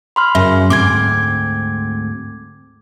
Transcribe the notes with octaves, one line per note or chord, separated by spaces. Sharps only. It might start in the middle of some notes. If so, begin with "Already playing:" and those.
B5 C6 F6
F#2 C#3 E5
D2 G#2 C4 D6 G#6